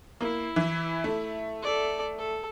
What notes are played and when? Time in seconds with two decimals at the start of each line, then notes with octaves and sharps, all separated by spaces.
0.21 A#3 E4
0.56 E3
1.04 A3
1.62 A4 D5
2.18 A4